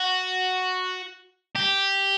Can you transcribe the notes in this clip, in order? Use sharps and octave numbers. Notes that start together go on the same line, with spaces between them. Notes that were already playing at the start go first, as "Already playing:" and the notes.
Already playing: F#4
G4